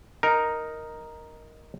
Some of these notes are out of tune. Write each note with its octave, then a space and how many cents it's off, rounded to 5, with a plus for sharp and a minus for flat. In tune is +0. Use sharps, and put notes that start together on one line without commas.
D#4 +0 A#4 +0